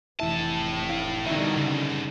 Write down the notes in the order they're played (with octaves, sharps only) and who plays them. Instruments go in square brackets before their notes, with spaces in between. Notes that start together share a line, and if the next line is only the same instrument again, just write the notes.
[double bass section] F1 [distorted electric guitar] A2 A5 [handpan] E3 E4 E5
[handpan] E4 F5
[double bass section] B2 D3 G3 [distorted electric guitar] D#3 F#3 [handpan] D#4 E5
[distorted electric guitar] C2 F#2 [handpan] C#3